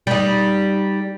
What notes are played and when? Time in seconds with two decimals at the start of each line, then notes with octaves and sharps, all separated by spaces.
0.07 G3 D#4